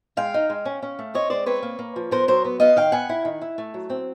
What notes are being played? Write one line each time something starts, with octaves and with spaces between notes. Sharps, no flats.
G#3 F5 G5
D#4
G#3
C#4
C#4
A3
C4 C#5 D#5
G#3 C5 D5
C4 B4 C#5
A#3
A#3
F3
B3 A#4 C5
F#3 A#4 C5
B3
B3 D#5 F5
D#3 F5 G5
B3 F#5 G#5
E4
D#3
E4
A3
F#3
C4